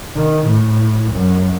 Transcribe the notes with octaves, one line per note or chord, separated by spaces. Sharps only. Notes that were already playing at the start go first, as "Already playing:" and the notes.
D#3
A2
F#2